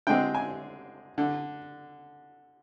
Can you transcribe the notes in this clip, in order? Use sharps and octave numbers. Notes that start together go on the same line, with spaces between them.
D3 G#3 C4 G5
G#5
D3